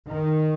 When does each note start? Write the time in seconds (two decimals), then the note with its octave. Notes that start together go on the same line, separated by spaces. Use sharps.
0.08 D#3